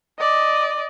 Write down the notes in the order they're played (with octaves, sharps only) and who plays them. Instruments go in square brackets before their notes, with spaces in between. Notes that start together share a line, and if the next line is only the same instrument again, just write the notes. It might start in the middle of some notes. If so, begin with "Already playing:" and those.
[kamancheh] D5 D#5